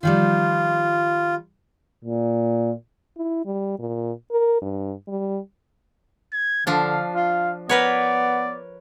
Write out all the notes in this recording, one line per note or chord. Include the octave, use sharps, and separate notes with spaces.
D#3 F3 G3 F4
A#2
E4
G3
A#2
A#4
G2
G3
G#6
D3 F3 D4 F5
F4 F5
B3 A#4 B4 C#5 D5